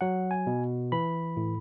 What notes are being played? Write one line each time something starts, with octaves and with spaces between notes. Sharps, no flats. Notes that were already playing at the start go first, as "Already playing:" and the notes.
F#3 F#5
G#5
B2
E3 B5
A2